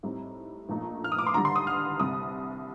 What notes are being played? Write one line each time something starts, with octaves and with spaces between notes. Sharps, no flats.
A2 G3 C4 D#4
A#1 A#2 A3 D#4
F6
D#6
D6
C6
D#2 D3 G3 A#5
C6
D#6
F6
C2 C3 G3 D#6